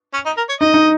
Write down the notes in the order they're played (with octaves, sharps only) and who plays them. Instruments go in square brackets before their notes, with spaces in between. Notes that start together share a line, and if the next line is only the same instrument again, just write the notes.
[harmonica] C#4
D#4
A#4
C#5
[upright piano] D#4 [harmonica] D#5
[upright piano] D#4